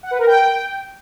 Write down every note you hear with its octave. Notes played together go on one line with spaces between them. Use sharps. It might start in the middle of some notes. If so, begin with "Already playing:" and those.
F#5
B4
A#4
G5